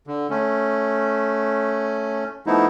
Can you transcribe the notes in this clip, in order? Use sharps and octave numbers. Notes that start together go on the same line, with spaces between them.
D3
A3 C#4
F3 A3 B3 D#4 E4